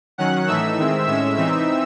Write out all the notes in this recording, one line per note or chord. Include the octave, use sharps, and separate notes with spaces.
D#3 F#3 C#4 F#5 F#6
A2 E3 A3 D#4 E5 E6
D#3 G#3 C4
A2 G#3 C#4 E5 E6
C3 E3 C4 D#4 E5 E6